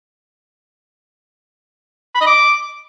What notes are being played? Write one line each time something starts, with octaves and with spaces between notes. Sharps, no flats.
B5
D#5
D6